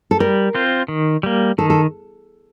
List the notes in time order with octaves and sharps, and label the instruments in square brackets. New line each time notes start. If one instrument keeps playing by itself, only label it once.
[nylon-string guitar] A4
[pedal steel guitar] G3 [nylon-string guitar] A#4
[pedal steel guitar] C4 F4 C5
D#3
G3 A#3
[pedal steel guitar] D#3 [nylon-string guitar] A4
[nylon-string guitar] A4